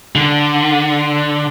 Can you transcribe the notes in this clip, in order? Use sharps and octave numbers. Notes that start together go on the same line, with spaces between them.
D3